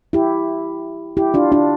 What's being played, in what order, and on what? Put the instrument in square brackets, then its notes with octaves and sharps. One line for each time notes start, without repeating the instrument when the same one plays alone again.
[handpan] E4 G4
E4 G4
D4 F4
D4 F4